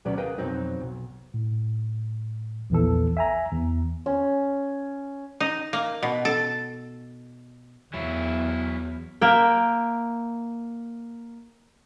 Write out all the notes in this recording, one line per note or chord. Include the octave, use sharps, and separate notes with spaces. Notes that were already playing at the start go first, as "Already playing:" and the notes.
D2 B2 F#3 B3 C#4 D5
G#4 A#4 B4 D#5 F5 G5
F2 B2 F#3 C4 D#4
B1
A2
A#1 E2 E3 A4
E5 G#5 A#5
E2
C#4
D#4
A#3
B2
A4
E2 F#3 E4
A#3 E5 G5